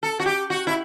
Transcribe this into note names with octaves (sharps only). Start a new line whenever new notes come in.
A4
F#4
G4
F#4
E4